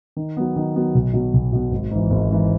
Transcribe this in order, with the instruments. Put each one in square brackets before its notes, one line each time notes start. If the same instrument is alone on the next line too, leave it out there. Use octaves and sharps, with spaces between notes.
[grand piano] D#3
F#3 B3
D#3
F#3 B3
B1
B2 F#3 B3
B1
B2 F#3 B3
G#1
G#2 E3
G#1
G#2 E3